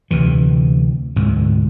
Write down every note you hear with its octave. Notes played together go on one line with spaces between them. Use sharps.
D2 C3 E3
D2 G#2 B2